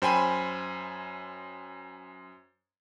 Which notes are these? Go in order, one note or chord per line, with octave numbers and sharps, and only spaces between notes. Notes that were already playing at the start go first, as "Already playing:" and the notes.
F#2 C5 G5 G#5 B5